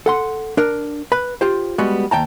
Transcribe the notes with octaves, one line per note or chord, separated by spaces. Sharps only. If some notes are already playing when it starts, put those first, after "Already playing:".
A4 F#5 C6
D4 A#4
B4 B5
F4 G4 C5
G3 G#3 B3 F#4
D#2 G5 A5 A#5